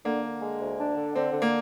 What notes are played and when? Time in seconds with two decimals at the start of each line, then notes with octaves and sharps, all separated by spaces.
0.05 D3 A#3
0.24 D3
0.42 G#3
0.60 D2
0.79 D4
0.96 D3
1.15 D3 C4
1.33 D3
1.42 A#3